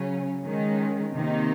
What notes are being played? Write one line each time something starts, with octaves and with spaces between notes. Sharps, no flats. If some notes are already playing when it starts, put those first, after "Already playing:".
Already playing: C#3 F#3 C#4
D#3 G#3 C#4
C3 D#3 A#3 D#4